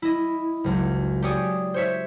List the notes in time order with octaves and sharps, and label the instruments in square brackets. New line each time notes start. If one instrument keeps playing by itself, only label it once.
[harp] E4 D#5
F#1 C#2
G4 G#4 C#5 D5 G#5 D#6
C5 C#5 E5